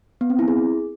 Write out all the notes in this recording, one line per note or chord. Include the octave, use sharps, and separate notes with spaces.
B3
C4
E4
G#4